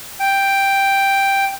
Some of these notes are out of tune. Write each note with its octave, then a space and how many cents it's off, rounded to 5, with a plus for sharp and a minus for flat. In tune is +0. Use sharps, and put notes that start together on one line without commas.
G5 +5